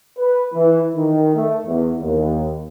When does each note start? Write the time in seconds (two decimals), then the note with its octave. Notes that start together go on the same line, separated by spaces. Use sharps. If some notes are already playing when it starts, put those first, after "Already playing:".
0.18 B4
0.54 E3
0.95 D#3
1.35 A3
1.66 E2
2.01 D#2